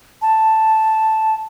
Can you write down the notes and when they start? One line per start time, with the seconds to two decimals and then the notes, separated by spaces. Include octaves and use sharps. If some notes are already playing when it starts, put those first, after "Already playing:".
0.22 A5